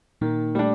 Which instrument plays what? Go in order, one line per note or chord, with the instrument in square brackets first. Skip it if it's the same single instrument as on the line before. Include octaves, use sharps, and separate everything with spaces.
[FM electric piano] A#2 A#3 [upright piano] D#3
[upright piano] G3 D4 [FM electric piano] A3